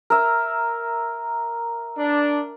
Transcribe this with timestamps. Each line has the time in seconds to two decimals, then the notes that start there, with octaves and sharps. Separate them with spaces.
0.10 A#4 E5
1.98 D4